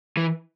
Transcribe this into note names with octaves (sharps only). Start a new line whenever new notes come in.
E3